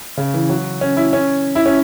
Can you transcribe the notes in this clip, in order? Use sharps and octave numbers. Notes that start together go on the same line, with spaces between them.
C#3
E3
F#3
C#4
E4
C#4
E4
C#4